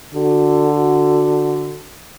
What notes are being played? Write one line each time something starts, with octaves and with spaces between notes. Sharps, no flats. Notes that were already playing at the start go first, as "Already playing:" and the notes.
D3 F#4